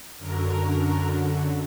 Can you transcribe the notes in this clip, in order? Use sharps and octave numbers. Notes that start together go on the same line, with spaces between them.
F#2 D3 F#3 A#4